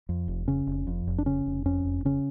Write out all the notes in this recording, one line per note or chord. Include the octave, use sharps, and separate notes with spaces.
F2
F1
C#3 C#4
F1
F2
F1
D4
C#3 C#4
F1
F2 C#4
F1
C#3 C#4